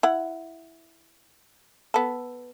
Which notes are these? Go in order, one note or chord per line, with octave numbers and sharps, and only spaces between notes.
E4 F#5
B3 A4